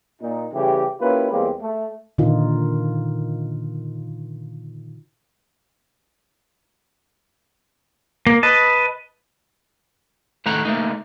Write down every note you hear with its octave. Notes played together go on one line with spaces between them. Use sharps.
A#2 D#4
C#3 E3 G3 A3 G4
A#3 C#4 E4 F4 G4 B4
E2 G3 G#3 A#3 C4 G4
A3
A#2 D3 D#3 D#4 F4
A#3
B4 D#5 A5
A2 D#3 A3 F#5 A#5
A3 A#3 D#4